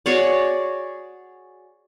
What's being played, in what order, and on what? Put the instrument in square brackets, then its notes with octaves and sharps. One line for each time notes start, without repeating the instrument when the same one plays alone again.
[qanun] F#4 G#4 C#5 D5